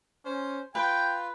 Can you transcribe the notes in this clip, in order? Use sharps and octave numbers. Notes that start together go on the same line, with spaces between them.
C#4 C5
F4 B4 G5